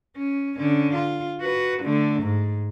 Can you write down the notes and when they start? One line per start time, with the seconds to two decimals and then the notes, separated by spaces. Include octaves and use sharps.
0.17 C#4
0.58 D3 C#4
0.94 F4
1.41 F#4 B4
1.82 D3 A3
2.23 G#2